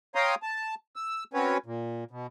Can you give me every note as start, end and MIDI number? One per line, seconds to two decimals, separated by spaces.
0.15 0.35 73
0.15 0.35 77
0.15 0.35 79
0.15 0.35 82
0.15 0.35 84
0.15 0.35 87
0.43 0.75 81
0.96 1.24 88
1.34 1.58 60
1.34 1.58 61
1.34 1.58 66
1.34 1.58 71
1.34 1.58 73
1.66 2.04 46
2.11 2.27 47